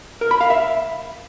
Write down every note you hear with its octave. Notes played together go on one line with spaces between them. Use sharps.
A#4
B5
F5
E5